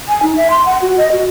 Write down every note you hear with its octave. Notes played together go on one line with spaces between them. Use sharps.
G#5
D#4
E5
C6
F#5
F#4
D#5
F#4